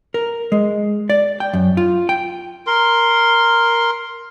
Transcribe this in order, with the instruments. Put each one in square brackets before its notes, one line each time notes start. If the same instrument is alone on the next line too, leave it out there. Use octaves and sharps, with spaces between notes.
[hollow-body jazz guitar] A#4
G#3
D5
G5
F#2
F4
G5
[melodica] A#4 C6